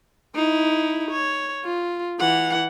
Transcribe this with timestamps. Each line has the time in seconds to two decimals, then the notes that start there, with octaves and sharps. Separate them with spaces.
0.35 D#4 E4
1.11 C#5
1.65 F4
2.20 E3 F#5